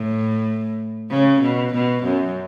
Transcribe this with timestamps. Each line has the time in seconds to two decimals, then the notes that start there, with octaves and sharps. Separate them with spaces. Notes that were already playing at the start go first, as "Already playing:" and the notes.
Already playing: A2
1.10 C#3
1.41 B2
1.73 B2
2.03 F#2